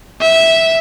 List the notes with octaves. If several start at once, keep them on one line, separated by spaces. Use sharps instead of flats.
E5